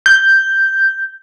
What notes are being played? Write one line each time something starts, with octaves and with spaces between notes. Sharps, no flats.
G6